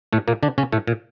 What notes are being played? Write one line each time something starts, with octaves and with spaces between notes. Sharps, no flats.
A2 A3
A#2 A#3
D3 D4
C#3 C#4
A2 A3
A#2